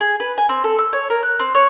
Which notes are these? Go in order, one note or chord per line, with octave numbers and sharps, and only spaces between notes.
G#4
B4
G#5
C4
A4
E6
C#5
A#4
F#6
C4
C#5